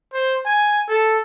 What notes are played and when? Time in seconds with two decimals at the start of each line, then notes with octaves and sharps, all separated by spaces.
0.13 C5
0.46 G#5
0.89 A4